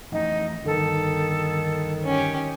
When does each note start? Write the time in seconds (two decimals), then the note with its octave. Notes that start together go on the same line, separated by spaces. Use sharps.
0.12 A1 F2 D#4
0.65 G1 D#3 A4
2.05 C#4 G4